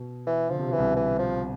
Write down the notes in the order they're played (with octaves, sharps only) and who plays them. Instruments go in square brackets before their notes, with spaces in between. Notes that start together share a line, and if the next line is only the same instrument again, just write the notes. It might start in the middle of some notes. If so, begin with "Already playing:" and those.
Already playing: [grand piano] B2
[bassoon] E3
[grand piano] D3 [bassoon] F3
[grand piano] C3
[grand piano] B2 [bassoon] E3
[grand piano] C2 C3
[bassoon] E3
F3